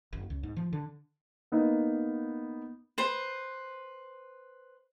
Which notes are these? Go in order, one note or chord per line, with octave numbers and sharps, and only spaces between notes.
F#1
C#2
G#2
F3
D3
A#3 B3 D#4
B4 C5